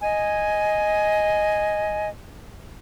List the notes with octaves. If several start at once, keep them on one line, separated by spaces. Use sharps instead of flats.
D#5 G#5